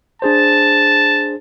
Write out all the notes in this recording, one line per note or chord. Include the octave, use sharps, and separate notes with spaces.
D4 G#4 C5 A5